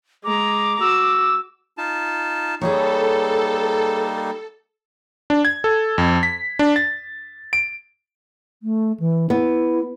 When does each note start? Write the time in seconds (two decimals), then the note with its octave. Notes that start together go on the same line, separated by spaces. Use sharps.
0.24 G#3 A#5 D6
0.81 F#4 E6
1.78 D#4 F4 A5
2.61 G3 A#3 D#4 G#4 A4 B4 C#5
5.30 D4
5.45 G#6
5.64 A4
5.98 F2
6.23 B6
6.59 D4
6.76 A6
7.53 D7
8.63 A3
9.00 E3
9.30 B3 E4